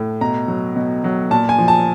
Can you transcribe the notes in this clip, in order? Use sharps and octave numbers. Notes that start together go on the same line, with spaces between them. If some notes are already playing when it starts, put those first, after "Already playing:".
Already playing: A2
B2 A#5
F#3
B2
F#3
A#2 A5
G#5
F3
A5